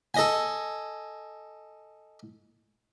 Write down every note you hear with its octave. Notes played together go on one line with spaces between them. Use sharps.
A4 D#5 G#5